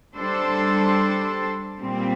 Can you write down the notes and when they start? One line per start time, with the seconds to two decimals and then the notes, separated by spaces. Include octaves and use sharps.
0.14 G3 D4 A4 C5
1.79 A#2 G3 C4